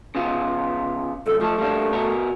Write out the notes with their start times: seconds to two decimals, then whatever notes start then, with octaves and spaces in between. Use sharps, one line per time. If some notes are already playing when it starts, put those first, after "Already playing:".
0.15 C#3 B3 F4
1.26 C2 F#2 A4
1.41 F3 A3 A4
1.58 G3 A#3 D4
1.93 B2 B3 A#4